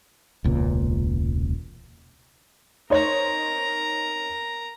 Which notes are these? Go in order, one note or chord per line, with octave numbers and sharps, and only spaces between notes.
E1 C#2 A#2
D#4 A#4 C5 C#5 A#5